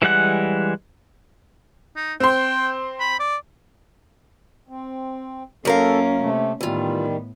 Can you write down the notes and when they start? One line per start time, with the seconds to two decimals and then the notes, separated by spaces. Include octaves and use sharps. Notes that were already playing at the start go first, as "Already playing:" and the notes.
0.02 E3 G3 G#3 F#5 F#6
1.96 D#4
2.20 C4 G5 C6
3.00 B5
3.19 D5
4.69 C4
5.65 F#2 A#3 C#4 A4 A#4 F5
6.19 C3 A3
6.61 A2 D#3 E3 G3 B3 F4